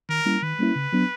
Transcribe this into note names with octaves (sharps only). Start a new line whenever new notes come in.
D#3 A#4
G3 A#3 C#4 E4
D#3 B4
G3 A#3 C#4 E4
C#3
F#3 B3 D4